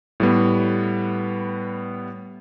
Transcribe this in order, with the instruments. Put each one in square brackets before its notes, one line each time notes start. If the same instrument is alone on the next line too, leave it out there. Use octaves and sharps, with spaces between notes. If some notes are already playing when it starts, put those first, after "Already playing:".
[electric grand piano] A2 G3 B3